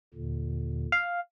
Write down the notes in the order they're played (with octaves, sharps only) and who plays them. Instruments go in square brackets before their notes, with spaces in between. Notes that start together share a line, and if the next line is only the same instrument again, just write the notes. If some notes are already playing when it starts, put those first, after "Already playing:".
[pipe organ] D#2 A#2 D3
[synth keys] F5